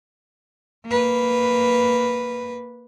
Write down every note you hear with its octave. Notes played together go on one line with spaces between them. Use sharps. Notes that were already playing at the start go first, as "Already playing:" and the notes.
A#3 B4